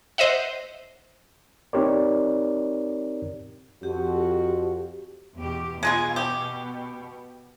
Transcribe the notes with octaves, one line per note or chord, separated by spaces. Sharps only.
C5 D#5 E5 F#5
C4 D#4 G4 A#4 C#5 D5
F2 F#4 G4
E2 B2 G4
B2 G#3 B3 F4 G#4
G4